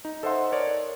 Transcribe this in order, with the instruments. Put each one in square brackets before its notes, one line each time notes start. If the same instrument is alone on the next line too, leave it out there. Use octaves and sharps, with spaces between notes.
[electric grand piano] D#4
A4 C5 D#5 E5 F#5 C6
A#4 C#5 D5